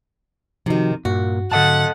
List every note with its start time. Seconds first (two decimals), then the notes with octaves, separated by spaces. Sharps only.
0.66 C3 D#3 F3 D#4 F#4
1.05 G2 A#2 F#4
1.52 G#2 D3 A4 D#5 F#5 A5